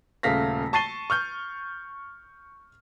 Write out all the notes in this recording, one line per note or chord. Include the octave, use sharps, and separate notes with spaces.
D#1 C#3 A3 F5 A#6 B6
A5 C#6 A6 C7 D#7 G7
C#6 F6 G6